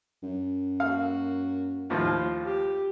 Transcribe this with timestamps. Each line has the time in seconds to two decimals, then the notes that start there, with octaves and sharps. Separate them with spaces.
0.22 F#2
0.80 A#3 F#4 F5
1.90 D#2 A2 F3 F4
2.45 G4